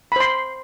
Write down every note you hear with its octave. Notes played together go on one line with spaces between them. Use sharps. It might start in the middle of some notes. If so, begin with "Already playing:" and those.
C5 B5 C6